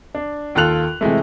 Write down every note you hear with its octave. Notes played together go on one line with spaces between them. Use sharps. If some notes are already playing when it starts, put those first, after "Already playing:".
D4
D#2 F4 A4 F#6 F7
C3 E3 G#3 A3